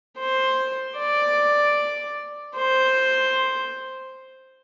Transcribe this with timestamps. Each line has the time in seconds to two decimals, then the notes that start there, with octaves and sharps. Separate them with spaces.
0.19 C5
0.98 D5
2.56 C5